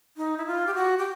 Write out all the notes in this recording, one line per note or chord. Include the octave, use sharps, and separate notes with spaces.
D#4
E4
F4
G4
F#4
G4